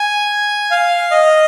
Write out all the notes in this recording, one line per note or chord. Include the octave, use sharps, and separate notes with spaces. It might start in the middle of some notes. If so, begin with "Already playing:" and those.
Already playing: G#5
F5
D#5